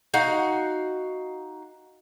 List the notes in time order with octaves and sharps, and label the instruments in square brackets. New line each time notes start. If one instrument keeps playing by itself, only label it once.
[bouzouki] D#4 F#4 F5